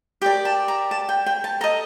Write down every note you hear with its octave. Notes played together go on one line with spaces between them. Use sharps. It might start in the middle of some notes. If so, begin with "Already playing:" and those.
G4 A#4 D5 G5
A5
A#5
A5
G5
G5
A5
A4 D#5 A#5